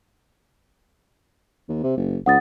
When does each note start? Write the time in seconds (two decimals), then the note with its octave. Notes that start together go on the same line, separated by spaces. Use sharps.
1.69 D#2
1.83 C3
1.98 F#1
2.26 C#2 F#5 D#6 A6